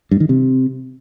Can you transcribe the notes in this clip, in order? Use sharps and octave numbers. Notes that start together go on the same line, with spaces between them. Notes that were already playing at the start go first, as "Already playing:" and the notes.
G2
D#3
C3